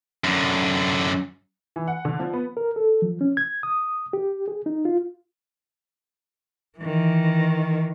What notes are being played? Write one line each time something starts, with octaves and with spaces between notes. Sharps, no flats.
F#2 D3
E3
F#5
D3
F3
B3
A#4
A4
F3
C#4
G#6
D#6
G4
G#4
D#4
F4
D#3 E3